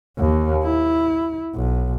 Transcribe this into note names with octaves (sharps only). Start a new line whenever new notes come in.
D#2
E4
B1